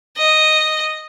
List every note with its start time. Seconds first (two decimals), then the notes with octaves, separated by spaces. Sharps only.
0.17 D#5